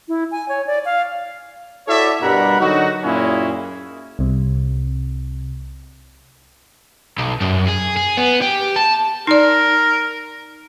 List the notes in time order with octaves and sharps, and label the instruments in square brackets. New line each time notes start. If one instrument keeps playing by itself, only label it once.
[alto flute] E4
G#5
C#5
D5
F5
[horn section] E4 F#4 A4 C#5 D5 E5
G2 B2 G3 A#4 F#5 B5
D3 F#3 D#4 F#4
F#2 A#2 A#3 C#4 E4 G#4
[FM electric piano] C2 C3
[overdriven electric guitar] B1
F#2
G#4
G#4
B3
G4
A5
[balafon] D#4 D5 [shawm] A#4